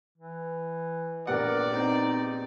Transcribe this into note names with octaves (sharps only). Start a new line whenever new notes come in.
E3
A#1 B3 G4 A#4 D5 F#5
C4 D#4